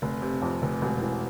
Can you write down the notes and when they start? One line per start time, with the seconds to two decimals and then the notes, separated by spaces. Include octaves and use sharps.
0.02 F1
0.22 C3
0.42 F2
0.62 F1
0.82 E1
1.02 E3